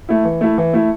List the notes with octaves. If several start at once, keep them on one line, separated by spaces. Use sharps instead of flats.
A3 E4
E3
A3 E4
E3
A3 E4